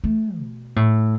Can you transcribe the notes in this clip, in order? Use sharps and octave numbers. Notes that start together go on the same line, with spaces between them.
A3
B2
A2